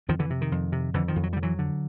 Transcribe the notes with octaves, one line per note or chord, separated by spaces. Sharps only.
F2 D#3 F3
D3 E3
C3
D#3
F2
C3
F2 D3 E3
D#3 F3
F2
F#3
D3 G3
E3 F#3
D3